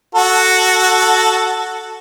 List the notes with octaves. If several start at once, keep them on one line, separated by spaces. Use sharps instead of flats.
F#4 A4